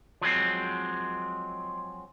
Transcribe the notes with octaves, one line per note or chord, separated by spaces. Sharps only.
F3 F#3 G#3 C4